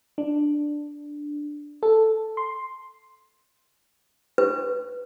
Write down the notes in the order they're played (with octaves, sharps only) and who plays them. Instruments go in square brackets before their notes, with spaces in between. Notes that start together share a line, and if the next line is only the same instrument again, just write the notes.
[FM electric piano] D4
A4
C6
[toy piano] B4